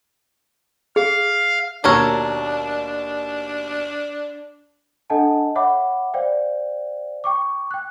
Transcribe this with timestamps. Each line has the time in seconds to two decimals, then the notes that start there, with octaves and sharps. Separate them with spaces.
0.96 G#4 F5
1.84 D#2 B2 D4 A4 A#4 C#5
5.10 D4 A4 D#5 F#5 G#5 A5
5.55 C#5 E5 F#5 B5 D6
6.14 C5 D5 F5 G5
7.24 G5 C#6 D6
7.71 G5 F#6